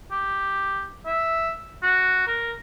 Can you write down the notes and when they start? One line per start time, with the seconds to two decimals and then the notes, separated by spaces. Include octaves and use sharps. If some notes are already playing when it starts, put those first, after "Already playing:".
0.11 G4
1.06 E5
1.83 F#4
2.27 A#4